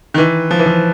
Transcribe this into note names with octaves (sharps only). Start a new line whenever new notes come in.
D#3
E3
F3
E3
F3